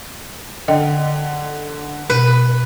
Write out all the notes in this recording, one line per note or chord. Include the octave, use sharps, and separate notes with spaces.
D3 D#5 G5
B2 B4